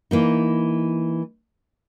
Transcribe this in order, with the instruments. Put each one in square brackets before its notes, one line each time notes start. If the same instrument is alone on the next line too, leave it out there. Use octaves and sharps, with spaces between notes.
[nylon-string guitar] E3 A#3 D#4